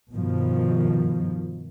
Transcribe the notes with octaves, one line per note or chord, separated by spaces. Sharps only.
G2 B2 D#3 F3